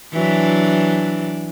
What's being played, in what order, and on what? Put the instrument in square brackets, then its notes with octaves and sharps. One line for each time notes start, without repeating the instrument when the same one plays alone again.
[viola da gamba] E3 F#3 D4